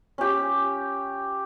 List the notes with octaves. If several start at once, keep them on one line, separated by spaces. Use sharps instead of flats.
C#4 G4